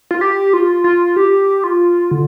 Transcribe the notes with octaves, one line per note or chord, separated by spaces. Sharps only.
F4
G4
F4
F4
G4
F4
D3